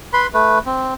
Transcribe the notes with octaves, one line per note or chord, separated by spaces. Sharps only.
B4 B5 C6
A3 B4
C4